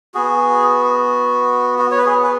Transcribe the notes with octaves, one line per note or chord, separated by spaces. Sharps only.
B3 F#4 G#4
F#4
C#5
B4
G#4
B4